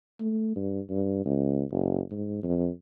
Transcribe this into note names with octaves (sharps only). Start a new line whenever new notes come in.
A3
G2
G2
C#2
F#1
G#2
F2